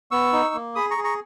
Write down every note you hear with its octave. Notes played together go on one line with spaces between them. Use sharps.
B3 C#6 E6
D#4
A#3
G#4 B5 D#6
A#5 C#6
G#4
A#5 C#6